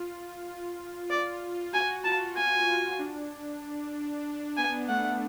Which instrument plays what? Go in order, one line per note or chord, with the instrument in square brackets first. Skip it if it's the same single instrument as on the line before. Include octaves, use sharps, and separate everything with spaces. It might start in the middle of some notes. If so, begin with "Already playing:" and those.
Already playing: [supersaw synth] F4
F4
[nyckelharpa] D5
[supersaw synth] F#4 [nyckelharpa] G#5
[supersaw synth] F4 [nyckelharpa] A5
[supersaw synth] F4 [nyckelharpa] G#5
[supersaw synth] F4
D4
D4
[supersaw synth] B3 [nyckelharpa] G#5
[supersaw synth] A3 [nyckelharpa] F#5